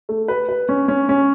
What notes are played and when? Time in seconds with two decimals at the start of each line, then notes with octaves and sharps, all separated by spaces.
0.09 A3
0.28 B4
0.49 B4
0.69 C#4
0.88 C#4
1.09 C#4